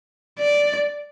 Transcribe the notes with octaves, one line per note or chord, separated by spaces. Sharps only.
D5